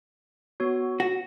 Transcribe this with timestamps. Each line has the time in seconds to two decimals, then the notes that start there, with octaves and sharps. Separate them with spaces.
0.60 B3 F#4 C#5
1.00 F#4